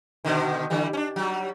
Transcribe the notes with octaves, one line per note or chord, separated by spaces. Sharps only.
B2 D3 D#3
D3 E3 G3
C#4 D4
F#3 G3